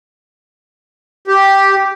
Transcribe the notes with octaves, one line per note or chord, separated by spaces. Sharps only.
G4